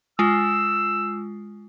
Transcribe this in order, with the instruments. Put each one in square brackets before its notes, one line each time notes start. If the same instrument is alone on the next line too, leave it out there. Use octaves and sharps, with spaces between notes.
[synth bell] G#3 F4 [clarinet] E6